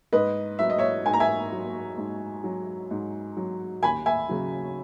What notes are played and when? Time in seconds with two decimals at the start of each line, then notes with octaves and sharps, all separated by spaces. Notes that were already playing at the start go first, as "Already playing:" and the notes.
0.13 G#2 B4 D#5
0.59 F#3 E5
0.70 D#5
0.78 C#5 E5
1.06 G#2 G#5
1.13 A#5
1.20 E5 G#5
1.52 F#3
1.97 G#2
2.44 F#3
2.91 G#2
3.37 F#3
3.83 D#2 G#5 B5
4.06 E5 G#5
4.29 C#3 F#3